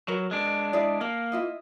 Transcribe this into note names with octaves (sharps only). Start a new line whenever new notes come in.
F#3 A#4 B4
G#3 D4
E4 G#4 D5
A#3 A5
E4 F4 D#5